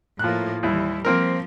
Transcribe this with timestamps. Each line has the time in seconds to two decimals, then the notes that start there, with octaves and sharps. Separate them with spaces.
0.19 A2 F3 A#3 F#6
0.63 D#2 E3 G3 E4
1.05 F3 A#3 C4 A#4